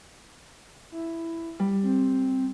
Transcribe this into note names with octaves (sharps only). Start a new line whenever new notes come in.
E4
G3
C4